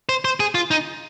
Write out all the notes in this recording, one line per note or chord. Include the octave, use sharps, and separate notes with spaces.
C5
C5
G#4
F4
D#4